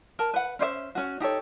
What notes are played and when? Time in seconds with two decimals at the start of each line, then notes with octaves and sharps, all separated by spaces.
0.19 A#4 A5
0.34 B4 F#5
0.59 C#4 C5 D5 E5
0.95 C#4 F#4
1.20 D#4 G4 A4 C#5